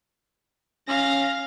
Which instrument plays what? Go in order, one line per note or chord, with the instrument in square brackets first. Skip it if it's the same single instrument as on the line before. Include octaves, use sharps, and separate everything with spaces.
[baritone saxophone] C#4 [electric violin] F5 A#6